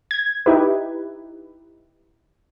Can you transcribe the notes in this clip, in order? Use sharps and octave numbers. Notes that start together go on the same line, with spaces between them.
G#6
D#4 E4 G4 B4